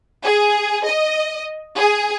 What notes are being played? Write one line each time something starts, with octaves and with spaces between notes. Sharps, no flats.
G#4
D#5
G#4